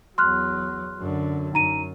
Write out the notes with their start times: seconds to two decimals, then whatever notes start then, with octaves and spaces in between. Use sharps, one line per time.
0.18 E2 F#3 C6 F6 F#6
0.99 F#2 D3
1.54 F#2 D#4 A#5 D#7